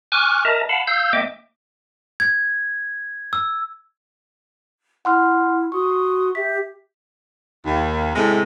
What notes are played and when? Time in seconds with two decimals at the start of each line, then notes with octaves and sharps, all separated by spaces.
0.12 G#5 C#6 D6 F6 F#6
0.45 A#4 D#5 E5 A5 A#5
0.69 F5 F#5 A5 B5
0.87 F5 E6 G6
1.13 A#3 D#5 E5 G5 D6
2.20 G#6
3.33 E6
5.05 E4 F#5 C6 F6
5.72 F#4 C6 C#6 D#6
6.35 G4 E5 B6
7.64 D#2
8.14 A2 C3 G#3